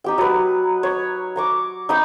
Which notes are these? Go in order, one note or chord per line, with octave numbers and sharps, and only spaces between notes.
D#4 G4 G5
F#3 B4
C#5
A#5 C#6 D6
D#4 G5 B5